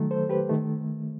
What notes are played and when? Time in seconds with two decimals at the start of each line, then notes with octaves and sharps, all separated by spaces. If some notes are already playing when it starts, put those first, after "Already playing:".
Already playing: D#3 F#3 A3
0.11 A4 C5
0.29 G4 B4
0.49 D#3 A3